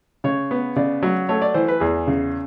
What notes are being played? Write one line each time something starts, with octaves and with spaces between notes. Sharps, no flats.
C#3 C#5
B3
C#3 D5
F#3
A3 C#5
D5
E3 C5
B4
E2 G#4
C#3